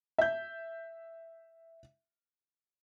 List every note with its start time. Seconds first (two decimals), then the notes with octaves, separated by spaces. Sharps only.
0.18 E5 G6